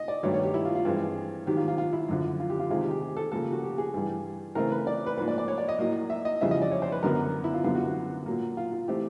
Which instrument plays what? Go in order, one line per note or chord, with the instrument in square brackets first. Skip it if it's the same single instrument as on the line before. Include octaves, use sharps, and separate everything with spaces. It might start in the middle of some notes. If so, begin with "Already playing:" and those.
Already playing: [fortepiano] D#5
D5
G2 D#3 F#3 A3 C#5
C#5
G4
E4
F4
F4
G2 E3 G#3 C4
G#2 D#3 F#3 G4
F4
F4
F4
E4
F#2 D3 F3
F4
G4
F4
C3 D#3 G#3 F4
G4
G4
G4
A4
C#3 F3 A#3 A4
G4
F#4
G4
G#4
G2 E3 G3
C#3 E3 A3 C4 A#4
B4
D5
B4
G#2 F3 A#3 B4
D5
D5
C#5
D5
D#5
A2 F#3 A#3
E5
D#5
F2 C#3 E3 G3 C4 E5
D#5
D5
C#5
C5
B4
F#2 D3 F#3 B3 A#4
E4
F4
F#2 D3 G3 B3 F4
F#4
F#4
A#2 F#3 A#3
F4
F4
E3 A3 C4 G4